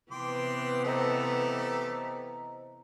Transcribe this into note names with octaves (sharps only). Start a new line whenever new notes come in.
C3 E3 B3 G5 C6 D6
A3 G4 A4 C5 D#5 A#5